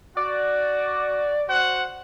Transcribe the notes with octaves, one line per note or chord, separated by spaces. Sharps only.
F#4 D5
F#4 C5 F#5